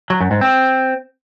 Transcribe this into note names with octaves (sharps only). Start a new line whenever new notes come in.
F#3
F#2
G#2
C4